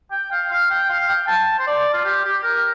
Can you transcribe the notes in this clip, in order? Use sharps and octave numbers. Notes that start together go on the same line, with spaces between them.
G5
F5
F5
G5
F5
G5
A5
C5
D5
F4
G4
G4
A#4